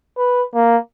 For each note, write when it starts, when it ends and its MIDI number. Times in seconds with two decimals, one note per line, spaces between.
0.18 0.43 71
0.55 0.77 58